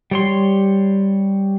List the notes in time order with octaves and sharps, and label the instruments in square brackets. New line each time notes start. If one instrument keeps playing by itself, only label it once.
[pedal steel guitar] G3 C#5 C6